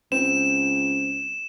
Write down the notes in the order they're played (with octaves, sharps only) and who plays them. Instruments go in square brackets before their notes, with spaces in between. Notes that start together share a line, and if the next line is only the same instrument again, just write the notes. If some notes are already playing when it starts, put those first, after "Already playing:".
[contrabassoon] C#2 [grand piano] C4 [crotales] E7